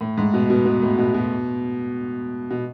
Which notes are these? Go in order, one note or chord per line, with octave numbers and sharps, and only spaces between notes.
A2
G#2
B2
B2
B2
A2
B2
B2
B2